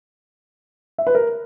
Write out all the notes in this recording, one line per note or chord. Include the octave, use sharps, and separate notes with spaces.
E5
B4
A#4